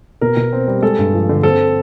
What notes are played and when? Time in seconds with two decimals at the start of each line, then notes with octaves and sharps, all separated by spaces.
0.21 B2 A#4
0.37 B2
0.53 C4
0.68 G3
0.82 G#3 A4
0.99 G2
1.14 F3
1.29 D3
1.43 C4 A4